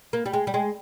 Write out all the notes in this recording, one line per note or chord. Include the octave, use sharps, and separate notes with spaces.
A#3
G3
G#3
G3
G#3